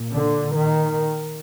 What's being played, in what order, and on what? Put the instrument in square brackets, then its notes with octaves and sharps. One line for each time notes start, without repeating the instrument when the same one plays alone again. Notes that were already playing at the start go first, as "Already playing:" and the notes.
Already playing: [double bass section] A#2
D3
D#3